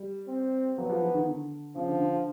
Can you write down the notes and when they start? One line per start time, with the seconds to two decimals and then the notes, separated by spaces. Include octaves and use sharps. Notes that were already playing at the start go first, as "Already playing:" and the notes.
Already playing: G3
0.28 C4
0.78 F#3 B3
0.89 F3
1.01 E3
1.14 D#3
1.27 D3
1.75 C#3 F3
1.88 D3
2.01 D3
2.13 D3